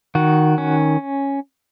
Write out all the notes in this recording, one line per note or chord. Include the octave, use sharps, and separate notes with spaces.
D#3 F#4
C#4